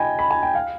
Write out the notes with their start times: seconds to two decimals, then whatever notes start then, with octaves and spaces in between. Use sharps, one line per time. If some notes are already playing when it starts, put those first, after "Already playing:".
Already playing: D#5 G5 G#5 B5
0.19 B5
0.31 G#5
0.43 G5
0.55 F5